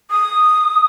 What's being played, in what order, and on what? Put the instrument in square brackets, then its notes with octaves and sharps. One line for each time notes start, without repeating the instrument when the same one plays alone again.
[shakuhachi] D#6